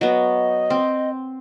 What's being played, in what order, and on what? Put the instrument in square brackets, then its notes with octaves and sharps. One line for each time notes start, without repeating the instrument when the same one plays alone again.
[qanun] F#3 B3 [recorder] D#5
[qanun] C4